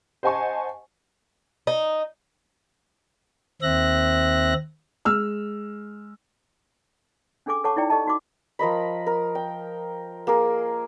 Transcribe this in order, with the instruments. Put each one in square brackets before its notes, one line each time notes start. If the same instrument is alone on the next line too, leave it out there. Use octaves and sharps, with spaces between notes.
[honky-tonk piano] C5 D#5 F#5 G#5 A5 C#6
[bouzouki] D#4
[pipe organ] D#2 C4 E5 F#6 A#6
[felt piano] G#3 E6 F6
[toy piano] C#4 D4 G#4 A4 G#5 D6
A4 C#5 F#5 A5 C#6 D6
D#4 E4 D5 G5 A#5
G4 A4 D5 D#5 A5
D#4 F#4 D6
[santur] F3 A#4 D#5 B5
A#4
G5
A#3 G#4 A#4